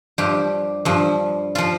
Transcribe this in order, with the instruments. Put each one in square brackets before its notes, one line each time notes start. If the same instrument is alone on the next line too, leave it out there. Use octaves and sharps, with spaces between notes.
[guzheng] G2 F3 G4
G2 F3
F3 F4